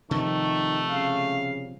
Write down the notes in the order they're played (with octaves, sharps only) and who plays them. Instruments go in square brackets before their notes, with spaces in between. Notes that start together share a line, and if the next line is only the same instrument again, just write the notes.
[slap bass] C3 F3 G3 [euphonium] D#3 [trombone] A3
[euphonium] C#3 [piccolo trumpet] F5